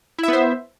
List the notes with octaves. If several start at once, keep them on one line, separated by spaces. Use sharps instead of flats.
B3 E4 C5 E5